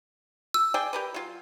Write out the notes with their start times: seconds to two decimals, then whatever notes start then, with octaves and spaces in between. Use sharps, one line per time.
0.54 E6
0.74 G#4 D5 G5
0.93 G4 A#4 B4
1.14 F#3 F4